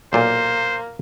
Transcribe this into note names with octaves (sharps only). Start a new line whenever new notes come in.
B1 A#2 A#3 F4 C5